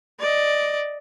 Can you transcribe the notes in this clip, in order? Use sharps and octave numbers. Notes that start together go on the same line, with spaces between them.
D5 D#5